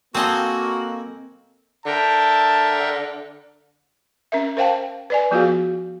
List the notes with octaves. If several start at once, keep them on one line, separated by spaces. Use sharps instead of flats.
A#3 C4 F#4 A4 D#5 G#5 A5
D3 A#4 E5 G5 A5
C#4 A#4 E5
A#4 C5 F5 G5 A5
B4 D5 G#5
F3 B3 F4 F#4 G#4 F5